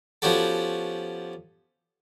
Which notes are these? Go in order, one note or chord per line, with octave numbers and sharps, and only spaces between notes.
F3 B3 C#4 F#4 G4 A4